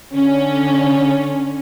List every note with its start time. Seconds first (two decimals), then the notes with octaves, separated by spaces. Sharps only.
0.14 D3 C#4